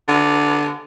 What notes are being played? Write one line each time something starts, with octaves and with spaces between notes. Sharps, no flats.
D3